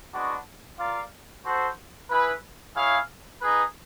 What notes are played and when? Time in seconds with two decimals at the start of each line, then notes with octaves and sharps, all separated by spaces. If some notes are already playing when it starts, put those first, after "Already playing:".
0.14 G#3 B3 D4 F#4
0.78 F4 A#4 D5 F5
1.45 F#4 A4 C5
2.10 E4 G#4 B4
2.76 E4 G#4 C#5 F5
3.41 D#4 G#4 B4